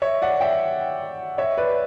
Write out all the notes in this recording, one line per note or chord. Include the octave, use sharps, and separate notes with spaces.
C#5 E5
D5 F#5
E5 G5
C#5 E5
B4 D5